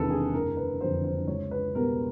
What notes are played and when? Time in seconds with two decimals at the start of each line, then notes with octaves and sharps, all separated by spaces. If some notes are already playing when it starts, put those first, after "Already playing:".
Already playing: E1 E2 C3 D#3 A4 B4
0.10 G#4
0.34 F#1 A#4
0.57 B4
0.81 F2 D3 F#3 C5
1.04 C5
1.27 C#2 C#5
1.51 B4
1.75 B2 G3 B3 A#4